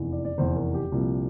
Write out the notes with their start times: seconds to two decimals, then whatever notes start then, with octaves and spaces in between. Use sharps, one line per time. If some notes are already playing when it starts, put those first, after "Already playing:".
Already playing: F1 E2 E3
0.12 D5
0.25 D5
0.38 F1 E2 E3 C5
0.56 A#4
0.74 G4
0.92 C2 A#2 F3 C4